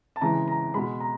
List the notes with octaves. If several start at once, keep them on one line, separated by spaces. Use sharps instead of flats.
A5
C#3 E3 G#3 A#5
A#5
B2 G#3 B5
A#5